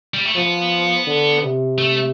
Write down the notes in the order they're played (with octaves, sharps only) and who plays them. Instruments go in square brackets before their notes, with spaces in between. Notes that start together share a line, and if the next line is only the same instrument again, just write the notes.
[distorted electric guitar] G3
A3
[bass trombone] F3 [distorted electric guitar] B3
[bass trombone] D3
C3
[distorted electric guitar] A3